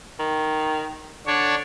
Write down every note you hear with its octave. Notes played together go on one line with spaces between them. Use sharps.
D#3
D3 D4 C#5